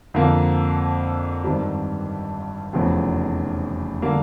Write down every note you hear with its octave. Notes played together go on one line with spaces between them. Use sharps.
F2 D3 F3 A#3
G#1 G2 D#3 G3 C4
F1 E2 C#3 F3
D3 G3 A#3